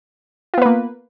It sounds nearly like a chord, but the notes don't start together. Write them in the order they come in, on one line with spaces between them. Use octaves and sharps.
F4 B3 B4 A#3